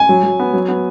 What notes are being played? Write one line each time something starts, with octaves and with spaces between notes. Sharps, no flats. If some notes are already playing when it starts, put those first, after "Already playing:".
Already playing: G#5
F#3
F#3
B3
F#3
B3